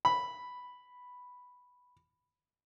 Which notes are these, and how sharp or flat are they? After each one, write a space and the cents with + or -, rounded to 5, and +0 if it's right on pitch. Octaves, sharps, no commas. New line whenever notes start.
B5 +0